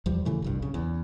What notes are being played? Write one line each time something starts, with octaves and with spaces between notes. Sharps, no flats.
E2 F3 G3
A#2 C#3 E3 A3
F#1 C2 G2
C#3
E2